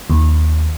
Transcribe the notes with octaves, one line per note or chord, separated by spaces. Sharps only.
D#2